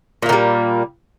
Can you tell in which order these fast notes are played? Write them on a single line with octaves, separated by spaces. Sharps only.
A#2 A#3 D#3 G3